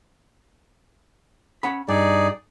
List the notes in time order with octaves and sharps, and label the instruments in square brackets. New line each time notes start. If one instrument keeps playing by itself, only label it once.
[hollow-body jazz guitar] C#4 F#5 B5
[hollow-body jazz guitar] G2 [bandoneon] D#4 G#4 D5